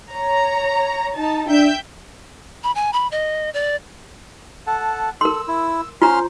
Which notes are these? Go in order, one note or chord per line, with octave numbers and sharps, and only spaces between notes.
C#5 A#5
D#4 A5
D4 E5 G5 G6
B5
G#5
B5
D#5
D5
A4 F#5 A5
A4 A#4 C6 E6
E4
C#4 F4 C5 A#5 C6 F6